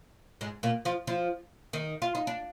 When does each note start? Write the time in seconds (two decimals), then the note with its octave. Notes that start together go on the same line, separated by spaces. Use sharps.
0.41 G#2 G#3
0.63 A#2 A#3
0.85 F3 F4
1.07 F3 F4
1.73 D#3 D#4
2.02 F4
2.15 D#4
2.27 D4